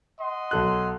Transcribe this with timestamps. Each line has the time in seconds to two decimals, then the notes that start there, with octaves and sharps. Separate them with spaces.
0.20 D#5 F#5 C6
0.51 B1 A4 F#6